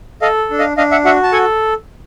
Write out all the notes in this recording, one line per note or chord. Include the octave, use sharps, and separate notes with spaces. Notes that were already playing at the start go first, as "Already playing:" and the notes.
A4 D#5 F5
D4
D#5 F5
D4 D#5 F5
E5 F#5
F#4 E5 F#5
A5
A4 F#5 G#5